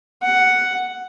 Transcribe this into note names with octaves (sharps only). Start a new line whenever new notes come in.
F#5